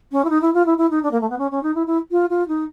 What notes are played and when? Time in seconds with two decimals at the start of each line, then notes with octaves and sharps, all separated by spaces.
0.11 C#4
0.24 E4
0.29 D#4
0.41 E4
0.54 F4
0.66 E4
0.77 E4
0.90 D#4
1.02 D4
1.11 A#3
1.20 A3
1.29 B3
1.38 C#4
1.51 C#4
1.63 D#4
1.74 E4
1.86 E4
2.11 F4
2.29 F4
2.48 D#4